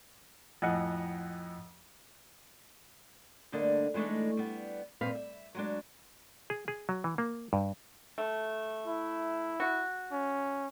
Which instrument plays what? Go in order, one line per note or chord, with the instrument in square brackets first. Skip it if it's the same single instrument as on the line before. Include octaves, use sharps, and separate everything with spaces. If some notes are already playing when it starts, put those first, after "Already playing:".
[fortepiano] F2 A2 D#5 F#5 G#5
[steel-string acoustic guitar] D2 G2 D3 A#3 D4 D#5
E3 G#3 A3 D4 D#4
G3 B3
G2 A#2 A#3 C4 B4 F5
E5
F#3 G#3 D4
[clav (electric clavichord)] G#4
G#4
F#3
E3
A#3
G2
[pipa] A3
[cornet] E4
[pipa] F#4
[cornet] C#4